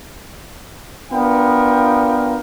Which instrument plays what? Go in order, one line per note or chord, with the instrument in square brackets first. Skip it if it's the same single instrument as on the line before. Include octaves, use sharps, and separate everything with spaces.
[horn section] B3 D4 F4 A#4 G5